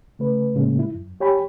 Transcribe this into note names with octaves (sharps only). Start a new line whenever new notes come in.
C#3 A3 B4
A2 C#3 G#3 A#3
E4
F#2
G4 C#5 G5 G#5 B5